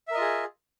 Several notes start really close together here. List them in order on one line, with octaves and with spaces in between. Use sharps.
E5 A#4 D#5 F4 G#4